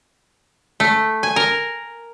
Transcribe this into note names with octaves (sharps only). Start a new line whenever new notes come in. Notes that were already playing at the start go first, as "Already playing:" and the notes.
A3
G#5
A#4